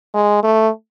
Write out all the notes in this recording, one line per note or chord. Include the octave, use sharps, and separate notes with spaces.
G#3
A3